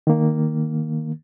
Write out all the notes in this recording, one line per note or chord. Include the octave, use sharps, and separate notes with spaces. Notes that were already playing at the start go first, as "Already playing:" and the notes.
D#3 A#3